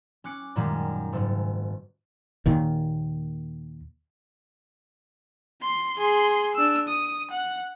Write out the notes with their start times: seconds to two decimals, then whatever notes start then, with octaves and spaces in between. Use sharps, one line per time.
0.24 C#4 D6 F#6 C#7
0.56 F#2 A#2 D#3 G3 G#3
1.13 F#1 G#2 A3
2.46 D#2 A#2 D#3
5.62 C6
5.98 G#4 C6
6.55 D4 E6
6.88 D#6
7.31 F#5